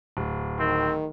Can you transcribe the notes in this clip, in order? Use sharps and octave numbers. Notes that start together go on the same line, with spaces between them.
D1
D#3 C4